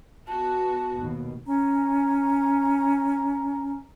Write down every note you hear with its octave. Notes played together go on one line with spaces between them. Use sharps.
B3 F#4 A5
D#2 B2
C#4 A#5